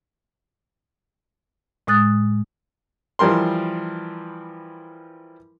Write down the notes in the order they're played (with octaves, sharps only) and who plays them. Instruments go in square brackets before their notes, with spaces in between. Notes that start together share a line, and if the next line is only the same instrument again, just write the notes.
[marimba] A2 G#3 D#6 F#6 A6
[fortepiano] E3 F3 G3 A#4 C6